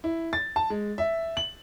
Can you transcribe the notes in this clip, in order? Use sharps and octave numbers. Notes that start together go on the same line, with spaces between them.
E4
A6
A5
G#3
E5
F#7